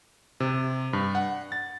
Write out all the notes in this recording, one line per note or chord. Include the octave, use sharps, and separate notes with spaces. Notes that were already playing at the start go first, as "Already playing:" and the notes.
C3
G2
F#5
A6